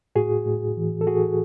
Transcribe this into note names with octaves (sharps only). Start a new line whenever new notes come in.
A2 F#4 G#4
A2
E3
A4
A2 F#4 G#4